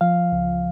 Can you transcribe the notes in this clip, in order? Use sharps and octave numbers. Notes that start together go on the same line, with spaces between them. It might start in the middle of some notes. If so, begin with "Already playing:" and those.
F3 F5
C#2